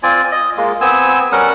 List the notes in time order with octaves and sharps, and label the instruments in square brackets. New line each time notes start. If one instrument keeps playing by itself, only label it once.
[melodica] C4 F4 D5 G#5
D#5
G#3 A#3 F4
B3 C4 G#5 E6
G3 C#4 A#4 F#5